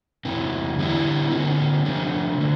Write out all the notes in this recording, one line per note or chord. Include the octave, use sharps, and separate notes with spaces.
E2 C3 E3
D3 G3 B3 E4
D3 G3 C4 F4
C3 F3 A3 D4 F4
D3 A3